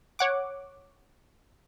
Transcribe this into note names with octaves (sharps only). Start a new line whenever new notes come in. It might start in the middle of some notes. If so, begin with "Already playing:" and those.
C#5 F#5 D6